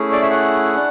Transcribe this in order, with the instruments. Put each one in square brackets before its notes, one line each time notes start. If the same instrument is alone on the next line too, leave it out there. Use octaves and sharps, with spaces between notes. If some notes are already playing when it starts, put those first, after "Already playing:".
Already playing: [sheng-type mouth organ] A3 C#4 E4 G#4
D5
E5
F#5
D4